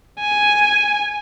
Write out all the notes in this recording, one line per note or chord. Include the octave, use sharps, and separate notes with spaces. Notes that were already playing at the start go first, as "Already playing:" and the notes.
G#5